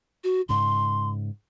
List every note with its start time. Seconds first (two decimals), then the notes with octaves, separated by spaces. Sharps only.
0.24 F#4
0.49 G#2 C#3 C6